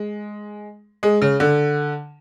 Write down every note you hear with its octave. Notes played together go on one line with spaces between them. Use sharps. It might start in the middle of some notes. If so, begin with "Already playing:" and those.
Already playing: G#3
G#3
C#3
D3